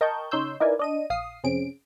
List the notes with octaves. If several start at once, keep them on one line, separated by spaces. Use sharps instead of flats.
A#4 D#5 G5 A5 C#6 G6
C#3 D#4 C#5 C6 E6 G6
D#4 E4 A#4 B4 D5 G#5
D4 D#5 D#7
A#1 F5 D#6 C7
F2 C3 C4 C#4 G#4 D7